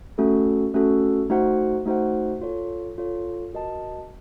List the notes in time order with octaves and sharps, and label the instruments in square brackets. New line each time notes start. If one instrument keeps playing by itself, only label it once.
[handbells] A3 C#4 F#4 A4
A3 C#4 F#4 A4
A3 D#4 F#4 C5 F#5
A3 D#4 F#4 C5 F#5
F4 A4 C#5
F4 A4 C#5
F#4 A#4 D#5 A5